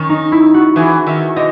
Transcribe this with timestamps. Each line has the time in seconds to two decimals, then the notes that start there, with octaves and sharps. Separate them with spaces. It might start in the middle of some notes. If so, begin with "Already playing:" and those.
Already playing: D#3 C#4
0.09 D#4
0.32 E4
0.54 F#4
0.76 E3 G#4
1.07 D#3 E5
1.36 B2 D#5